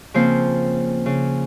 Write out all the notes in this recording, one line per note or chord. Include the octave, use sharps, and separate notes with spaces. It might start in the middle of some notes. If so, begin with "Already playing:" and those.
C#3 F3 A#3 C4 C5
C#3